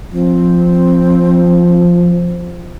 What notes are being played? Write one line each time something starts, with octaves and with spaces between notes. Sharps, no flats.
F3 C4